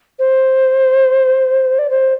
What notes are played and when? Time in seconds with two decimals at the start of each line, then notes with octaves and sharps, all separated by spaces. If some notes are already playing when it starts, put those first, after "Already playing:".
0.19 C5
1.79 D5
1.90 C5